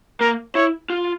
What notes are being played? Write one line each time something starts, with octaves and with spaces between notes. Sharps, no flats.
A#3 A#4
E4 C#5
F4